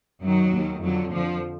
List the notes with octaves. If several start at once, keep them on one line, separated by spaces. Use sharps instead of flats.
F#2 D#3 F#3
D#2 D#3
F2 D3 F#3
F2 D3 F3